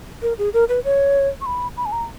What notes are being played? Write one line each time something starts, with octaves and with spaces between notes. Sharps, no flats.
A#4
G#4
A#4
B4
C#5
C#6
B5
B5
G#5
A#5